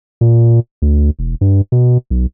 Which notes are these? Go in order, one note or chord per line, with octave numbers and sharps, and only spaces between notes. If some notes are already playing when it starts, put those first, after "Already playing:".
A#2
D2
E1
G2
B2
B1